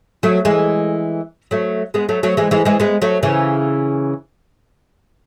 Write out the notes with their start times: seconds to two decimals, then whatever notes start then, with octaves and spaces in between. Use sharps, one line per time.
0.23 F#3 A3
0.45 E3 G#3
1.51 F#3 A3
1.94 G#3 B3
2.09 F#3 A3
2.23 F#3 A3
2.37 E3 G#3
2.51 E3 G#3
2.65 E3 G#3
2.80 G#3 B3
3.02 F#3 A3
3.23 C#3 E3